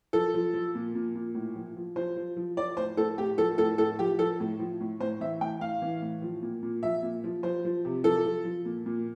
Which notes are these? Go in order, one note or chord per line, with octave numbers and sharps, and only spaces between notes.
F3 A4
F3
F3
A#2
A#2
A#2
A2
F3
F3
F3 C5
F3
F3
F3 D5
A2 C5
A2 A4
A2 G4
F3 A4
A2 A4
A2 A4
F3 G4
F3 A4
A2
F3
A2
A2 C5
E3 E5
A2 G5
A2 F5
E3
A2
F3
A#2
A#2
F3 E5
A#2
F3
F3 C5
F3
C3
F3 A4
F3
F3
A#2
A#2